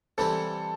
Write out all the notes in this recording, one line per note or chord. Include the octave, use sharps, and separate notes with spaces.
C3 E3 G3 C4 E4 A4